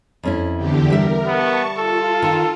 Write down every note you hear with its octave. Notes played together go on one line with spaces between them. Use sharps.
F2 C#4 E4
E2 D3 G4
G3 A#4 E5
B3 A5 C#6
F4 A4
D#3